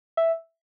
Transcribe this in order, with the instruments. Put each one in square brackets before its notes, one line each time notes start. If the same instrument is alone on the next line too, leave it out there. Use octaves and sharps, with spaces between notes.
[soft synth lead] E5